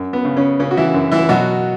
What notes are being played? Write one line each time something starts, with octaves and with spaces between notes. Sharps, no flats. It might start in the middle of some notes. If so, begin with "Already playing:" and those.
Already playing: F#2
B3
C#3
C#3 C#4
C#3 C#4
F#4
E3 E4
F#2
E3 E4
B2 F#3 F#4